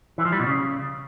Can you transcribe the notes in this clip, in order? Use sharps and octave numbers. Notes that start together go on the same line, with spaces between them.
E3
F3
G3
B2
C#3